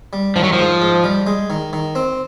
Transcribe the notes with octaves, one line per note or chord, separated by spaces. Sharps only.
G3
D#3 F3
F#3
F3
G#2
G#2
G3
G#3
D#3
D#3
C4